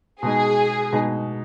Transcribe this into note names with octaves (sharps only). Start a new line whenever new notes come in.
B2 G#3 D#4 G#4
B2 G#3 D#4